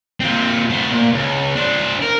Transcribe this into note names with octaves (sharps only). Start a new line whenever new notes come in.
A#2 C4
A3 C5
A#2 A#3
C#2
D4 C5
A#4